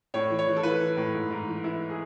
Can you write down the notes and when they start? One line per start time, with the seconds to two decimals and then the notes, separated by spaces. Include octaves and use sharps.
0.14 A2 C#5
0.30 E3
0.39 C#5
0.48 E3
0.56 A4
0.63 E3 B4
0.80 E3
0.97 A2
1.13 G#2
1.31 G#2
1.47 E3
1.64 E3 E4
1.90 G#4